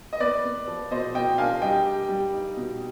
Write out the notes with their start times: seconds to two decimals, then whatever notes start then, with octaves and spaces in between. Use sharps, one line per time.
0.13 D#5
0.20 B3 B4 D5
0.44 B3
0.67 F3
0.91 B2 C5 D#5
1.15 B2 D#5 G5
1.38 D4 F5 G#5
1.62 G3 D#5 G5
1.86 G4
2.09 G3
2.33 D#4
2.57 B2